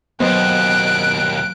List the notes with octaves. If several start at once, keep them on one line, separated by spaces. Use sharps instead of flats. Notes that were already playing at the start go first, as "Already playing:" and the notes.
D#2 B2 F#3 B3 C5 D#5 F#6 D7